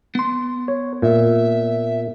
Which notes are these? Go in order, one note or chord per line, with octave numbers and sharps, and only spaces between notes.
B3 C6
C#5
A#2 E5